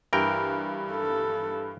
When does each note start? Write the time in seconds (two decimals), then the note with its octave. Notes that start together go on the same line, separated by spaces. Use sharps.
0.13 G2 E3 A#4 G5
0.91 A4